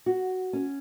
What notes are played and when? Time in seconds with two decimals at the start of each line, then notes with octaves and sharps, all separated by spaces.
0.06 F#4
0.53 C#4